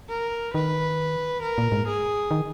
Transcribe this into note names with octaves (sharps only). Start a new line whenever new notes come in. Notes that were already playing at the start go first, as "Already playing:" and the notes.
A#4
D#3 B4
A#4
A#2
G#2
G#4
D#3